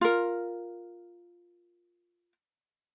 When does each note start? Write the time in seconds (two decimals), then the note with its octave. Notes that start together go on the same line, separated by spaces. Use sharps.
0.01 F4 A#4